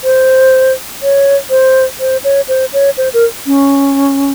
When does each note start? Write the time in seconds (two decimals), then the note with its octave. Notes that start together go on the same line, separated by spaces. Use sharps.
0.04 C5
1.02 C#5
1.50 C5
2.00 C5
2.24 C#5
2.48 C5
2.73 C#5
2.98 C5
3.14 A#4
3.46 C#4